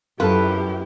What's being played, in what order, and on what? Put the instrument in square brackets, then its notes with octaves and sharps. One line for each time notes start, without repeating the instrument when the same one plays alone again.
[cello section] F#2 [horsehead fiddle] E4 G4 [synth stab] F4 A4 A5 [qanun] B4